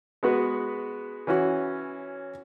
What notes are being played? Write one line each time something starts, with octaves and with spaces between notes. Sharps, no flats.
G#3 B3 F#4 B4
E3 C#4 F#4